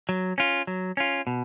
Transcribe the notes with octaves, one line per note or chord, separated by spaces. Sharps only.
F#3
C#4 F4
F#3
C#4 F4
B2